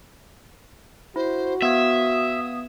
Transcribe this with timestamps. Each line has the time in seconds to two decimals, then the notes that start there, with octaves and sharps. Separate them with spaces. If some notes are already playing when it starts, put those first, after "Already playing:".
1.16 E4 F#4 C5
1.62 B3 E5 F5 D#6 G#6